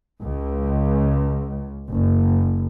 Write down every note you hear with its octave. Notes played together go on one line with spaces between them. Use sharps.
C#2
F#1